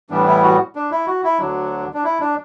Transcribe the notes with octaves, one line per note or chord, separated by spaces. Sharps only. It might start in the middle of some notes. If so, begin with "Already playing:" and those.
A2 E3 G3 B3 D4
E4
F#4
D4
E4
F#4
E4
D2 D3 F#3 D4
D4
E4
D4